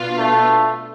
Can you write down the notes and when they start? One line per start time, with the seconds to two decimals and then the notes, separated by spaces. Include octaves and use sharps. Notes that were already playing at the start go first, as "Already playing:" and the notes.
Already playing: B2 B3 D4 F4 B4
0.19 A3